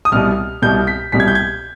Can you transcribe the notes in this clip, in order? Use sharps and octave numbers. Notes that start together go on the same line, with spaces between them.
D#6
C2 B2 G3 F6
C2 B2 G3 G6
B6
C2 B2 G3 B6
G#6
G6
G#6